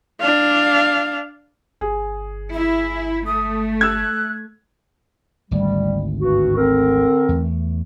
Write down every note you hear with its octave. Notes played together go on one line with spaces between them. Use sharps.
D4 F5
G1 G#4
E4 E5
A3 D#6
E6 F#6 G#6
G#1 D2 G3
G2 F#4
D3 C4 A#4
E2 A3